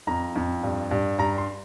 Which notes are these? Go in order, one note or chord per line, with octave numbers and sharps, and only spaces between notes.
F2 A#5
F2
G2
G2
G2 A#5
C6